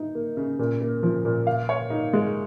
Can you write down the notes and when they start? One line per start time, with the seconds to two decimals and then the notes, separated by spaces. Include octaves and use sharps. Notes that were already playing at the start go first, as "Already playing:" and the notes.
Already playing: D#4
0.15 A#3
0.37 C#3
0.59 A#2
0.81 A#3
1.03 F3
1.25 A#2
1.47 F5
1.69 C#5
1.90 D#4
2.13 G#3